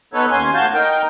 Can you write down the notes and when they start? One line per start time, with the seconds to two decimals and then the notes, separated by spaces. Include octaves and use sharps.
0.14 B3 D#4 A4 B4 C#5
0.30 D#2 C#4 G#5 C6
0.54 A2 F#4 F5 A5 G6
0.74 D#4 A#4 G5